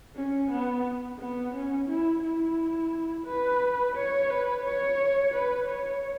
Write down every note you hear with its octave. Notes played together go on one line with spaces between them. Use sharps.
C#4
B3
B3
C#4
E4
E4
B4
C#5
B4
C#5
B4
C#5